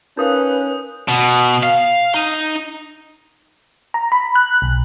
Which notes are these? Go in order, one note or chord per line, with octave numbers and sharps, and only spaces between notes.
C#4 D#4 A#4 B4 F5 D#6 G6
B2
F5
D#4
A#5
B5
F#6
B1